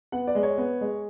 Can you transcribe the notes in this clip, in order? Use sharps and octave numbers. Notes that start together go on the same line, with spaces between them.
B3 F#5
D5
G#3
C#5
B3
G#3